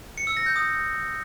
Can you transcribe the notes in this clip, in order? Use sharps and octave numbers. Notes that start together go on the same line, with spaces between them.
C#7
E6
A#6
G6
D#6